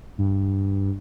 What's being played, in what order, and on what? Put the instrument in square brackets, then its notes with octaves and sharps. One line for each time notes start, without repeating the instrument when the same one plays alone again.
[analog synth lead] G2